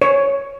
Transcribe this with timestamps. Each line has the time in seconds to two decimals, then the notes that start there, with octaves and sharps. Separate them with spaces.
0.02 C#5